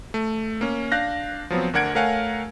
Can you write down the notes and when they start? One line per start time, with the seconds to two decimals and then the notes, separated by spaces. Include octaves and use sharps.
0.14 A3
0.61 A#3 C#4
0.92 D4 F5 F#6 G6 A#6
1.50 F3 F#3 B3 C4
1.73 D2 D4 A#4 F#5 G#6 D7
1.95 A3 A#4 C#5 F5 F#5 G#5